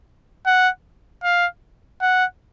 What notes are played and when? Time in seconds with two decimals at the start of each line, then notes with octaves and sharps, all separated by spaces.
0.46 F#5
1.23 F5
2.02 F#5